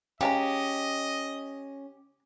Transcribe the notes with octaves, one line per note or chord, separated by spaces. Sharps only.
C#3 G#3 C#4 G4 D#5 A#5